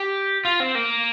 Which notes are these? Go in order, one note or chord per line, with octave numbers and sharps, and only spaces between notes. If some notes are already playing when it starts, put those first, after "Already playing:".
Already playing: G4
F4
C4
A#3